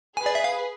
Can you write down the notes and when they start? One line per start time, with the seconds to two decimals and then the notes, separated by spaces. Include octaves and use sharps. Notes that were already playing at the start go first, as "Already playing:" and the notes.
0.17 G#4 B4 G#5
0.26 D5
0.35 E5
0.44 F5